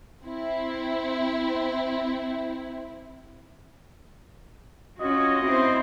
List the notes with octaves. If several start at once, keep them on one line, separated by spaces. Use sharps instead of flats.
C4 E4
C#4 F4 F#4 D#5
C4 E4 C5